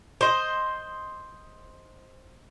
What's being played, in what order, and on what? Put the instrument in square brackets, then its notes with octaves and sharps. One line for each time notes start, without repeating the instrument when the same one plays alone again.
[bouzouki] C5 D#5